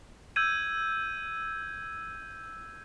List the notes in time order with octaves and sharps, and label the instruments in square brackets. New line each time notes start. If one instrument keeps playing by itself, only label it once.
[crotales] E6 G6 G#6 D#7